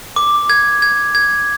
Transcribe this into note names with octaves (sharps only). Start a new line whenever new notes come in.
D6
G#6
G#6
G#6